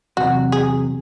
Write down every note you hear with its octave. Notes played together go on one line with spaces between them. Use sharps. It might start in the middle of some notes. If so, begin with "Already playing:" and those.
E2 C3 F#3 F#4
G#4